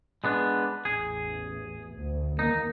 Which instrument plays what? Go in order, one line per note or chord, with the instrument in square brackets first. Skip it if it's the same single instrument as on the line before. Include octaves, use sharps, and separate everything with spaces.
[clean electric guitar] G#3 B3 D4
[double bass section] A1 E2 [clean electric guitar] G#4
[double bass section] D2
[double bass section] E2 D#3 A#3 [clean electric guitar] D#4